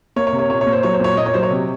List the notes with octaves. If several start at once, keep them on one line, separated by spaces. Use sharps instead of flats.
A#3 C#5
C#5
C3
C#5
A#2 C#5
C#5
A#3
C5
F#3 C#5
C5
A#2 C#5
A#3 D#5
C#5
F#3 C5
C#5
C3